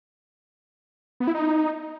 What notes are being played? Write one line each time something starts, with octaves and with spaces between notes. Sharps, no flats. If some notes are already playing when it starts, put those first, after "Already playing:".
B3
E4
D#4